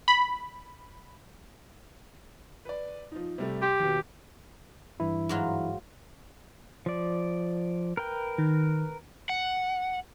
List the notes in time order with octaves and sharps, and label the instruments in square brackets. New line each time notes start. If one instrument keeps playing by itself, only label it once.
[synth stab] B5
[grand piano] B4 D5
F3 D#4
C3 G3 A3
[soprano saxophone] G4 [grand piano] C6
[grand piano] D#2 B2
[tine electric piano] G2 E3 E4
[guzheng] G#2 F#3 F4
[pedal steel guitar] F3 D5
A#4 B4 G5
[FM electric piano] D#3
[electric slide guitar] F#5